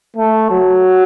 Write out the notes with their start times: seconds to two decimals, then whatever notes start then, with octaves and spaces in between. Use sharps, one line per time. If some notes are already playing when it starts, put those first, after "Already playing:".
0.16 A3
0.51 F#3